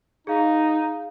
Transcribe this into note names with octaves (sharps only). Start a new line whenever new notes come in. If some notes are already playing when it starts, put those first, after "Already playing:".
D#4 G#4 F5